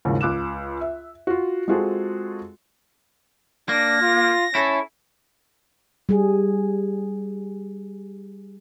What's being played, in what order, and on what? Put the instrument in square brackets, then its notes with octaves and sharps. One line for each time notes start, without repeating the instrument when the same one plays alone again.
[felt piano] D#2 G#2 C#3 E3 F3
C#2 D6 F#6 E7
E5
F4 F#4
G#3 C4 F4 F#4 G#4 A4
[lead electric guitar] A#3 [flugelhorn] D4 [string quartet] A#6
[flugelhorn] F4
[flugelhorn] C#4 [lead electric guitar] E4 A4
[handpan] G3 G#4